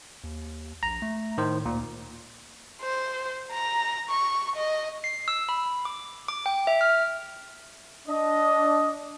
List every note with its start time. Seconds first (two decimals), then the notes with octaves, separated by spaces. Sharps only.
0.24 D#2
0.83 A#1 A#5
1.02 A3
1.38 A2 D#3 C5
1.66 D2 A#2
2.82 C5
3.51 A#5
4.10 C#6
4.56 D#5
5.04 C7
5.28 E6
5.49 B5
5.85 D6
6.28 D6
6.46 G5
6.67 E5
6.81 F6
8.08 D4 D#5